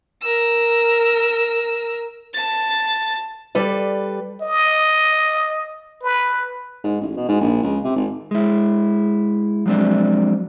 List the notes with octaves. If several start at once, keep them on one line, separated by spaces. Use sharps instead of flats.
A#4 E6
A5 A6
G3 A4 B4 D5
D#5
B4
G#2
A1
B2
G#2
A#1
C#2
C3
G#1
G#3 E4
F3 F#3 G#3 C4 D4